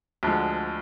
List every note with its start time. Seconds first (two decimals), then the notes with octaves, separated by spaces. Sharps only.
0.23 D2 D3 F3 G#3